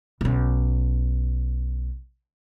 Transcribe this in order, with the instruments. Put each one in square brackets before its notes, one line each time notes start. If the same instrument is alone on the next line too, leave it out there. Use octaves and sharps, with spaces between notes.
[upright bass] B1 C#4